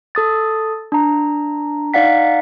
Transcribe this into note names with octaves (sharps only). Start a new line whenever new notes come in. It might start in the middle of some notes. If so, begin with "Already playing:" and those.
A4 D#6 A6
D4 A#5
D#4 D5 F5 F#5 B6